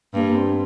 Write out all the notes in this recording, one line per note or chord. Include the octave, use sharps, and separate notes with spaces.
G2 A#3
A#3
C4